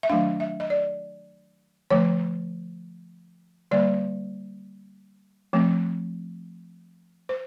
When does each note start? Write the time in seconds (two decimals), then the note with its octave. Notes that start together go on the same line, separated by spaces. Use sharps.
0.03 E5
0.09 D#3 F#3 A3 D4 F5
0.40 E5
0.60 D#5
0.70 D5
1.90 D3 F3 A3 C#5
3.71 D3 G3 A#3 D5
5.53 F3 A3 C4
7.29 C5